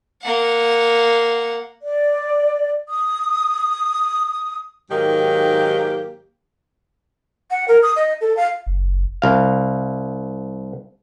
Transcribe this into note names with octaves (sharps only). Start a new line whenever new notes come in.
A#3 F#5
D5
D#6
G#2 D#3 F#3 A#3 G4
F#5
A#4
D#6
D#5
A4
F5
F#1
C2 F5